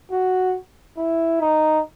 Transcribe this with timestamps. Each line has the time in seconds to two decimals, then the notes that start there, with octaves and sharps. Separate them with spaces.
0.12 F#4
0.98 E4
1.41 D#4